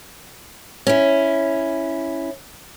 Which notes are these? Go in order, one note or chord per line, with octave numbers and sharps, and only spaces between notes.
C#4 E4